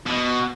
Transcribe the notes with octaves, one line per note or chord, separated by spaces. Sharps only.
B2